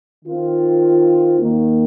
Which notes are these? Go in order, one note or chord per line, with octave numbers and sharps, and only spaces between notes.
D#3 C4 F4 A#4
D#2 D#3 A#3